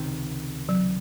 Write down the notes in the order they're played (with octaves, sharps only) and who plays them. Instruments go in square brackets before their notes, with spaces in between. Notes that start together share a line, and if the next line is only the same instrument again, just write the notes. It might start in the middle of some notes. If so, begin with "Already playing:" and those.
Already playing: [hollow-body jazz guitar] C#2 C3 D#3
[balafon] F#3